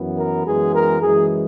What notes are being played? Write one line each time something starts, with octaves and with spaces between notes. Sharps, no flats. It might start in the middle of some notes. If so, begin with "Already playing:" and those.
Already playing: F#2 E3 B3
A#4
F#2 E3 G#3 B3 G#4
A#4
F#2 E3 G#3 G#4